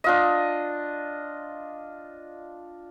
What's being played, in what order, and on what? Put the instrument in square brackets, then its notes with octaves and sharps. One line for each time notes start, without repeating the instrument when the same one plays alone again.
[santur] D4 F4 D#5